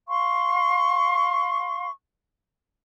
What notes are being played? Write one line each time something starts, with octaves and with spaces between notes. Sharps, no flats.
F5 C6 C#6